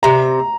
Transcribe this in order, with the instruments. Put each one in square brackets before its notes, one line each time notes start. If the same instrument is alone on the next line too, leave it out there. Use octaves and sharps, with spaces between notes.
[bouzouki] C3 [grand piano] A#5